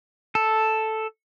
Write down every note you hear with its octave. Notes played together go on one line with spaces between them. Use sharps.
A4